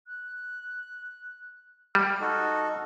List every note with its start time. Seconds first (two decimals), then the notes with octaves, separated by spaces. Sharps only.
0.07 F#6
1.95 G3 F6
2.21 D#4 F#4 A4